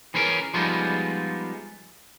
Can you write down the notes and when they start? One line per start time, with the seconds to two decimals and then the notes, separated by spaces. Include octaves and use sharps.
0.14 E3 C#4 G#4 A#4
0.54 F3 G3 G#3 B3 D#4 F4